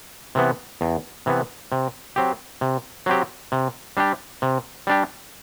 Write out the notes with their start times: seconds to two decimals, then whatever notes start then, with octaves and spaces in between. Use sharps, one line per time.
0.35 C3 E3 B3
0.81 E2
1.26 C3 E3 B3
1.72 C3
2.16 F#3 C4 G4
2.61 C3
3.06 F#3 C4 G4
3.52 C3
3.97 G3 D4 G4
4.42 C3
4.87 G3 D4 G4